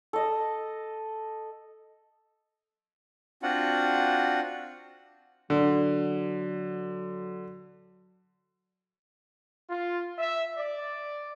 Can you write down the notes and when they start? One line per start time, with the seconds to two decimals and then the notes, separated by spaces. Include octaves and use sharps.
0.13 A4 D#5
3.43 C4 D4 F4 F#4 F#5
5.50 D3 F#3
9.69 F4
10.18 E5
10.57 D5